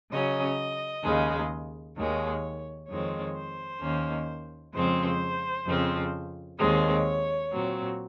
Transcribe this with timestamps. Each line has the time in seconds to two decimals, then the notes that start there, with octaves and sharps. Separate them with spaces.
0.11 C#3 F#3 C#4 D#5
1.04 D#2 C#3 G#3
1.96 D#2 D#3 G#3 C#5
2.88 F2 D#3 G#3 C4 C#5
3.35 C5
3.81 D#2 D#3 A#3 C#4
4.74 F2 C#3 F3 G#3 C4 C5
5.66 F2 C#3 F3 C4
6.59 D#2 D#3 G#3 C4 C#5
7.51 A#2 F#3 C4